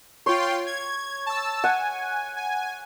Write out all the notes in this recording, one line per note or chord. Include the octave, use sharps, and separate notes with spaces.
F4 C#5 G5 C6
G#6
A5 E6
F#5 G#5
G#5